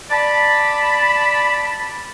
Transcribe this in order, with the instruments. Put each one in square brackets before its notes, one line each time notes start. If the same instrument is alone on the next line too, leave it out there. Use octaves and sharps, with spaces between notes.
[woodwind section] D5 A5 B5